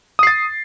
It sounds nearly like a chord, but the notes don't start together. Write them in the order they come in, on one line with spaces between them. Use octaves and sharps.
D#6 C7 A6